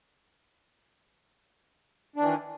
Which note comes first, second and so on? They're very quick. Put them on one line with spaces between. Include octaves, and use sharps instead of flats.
D4 E3 D#3